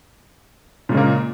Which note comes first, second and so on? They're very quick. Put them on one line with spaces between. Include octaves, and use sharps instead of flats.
A#2 G#3 C#3 A#3